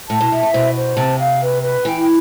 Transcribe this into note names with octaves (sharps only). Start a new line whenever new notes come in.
A2 A5
B2
B2 E5
A2
B2 C5
C5
C3 A5
F5
B4
B4
E3 G5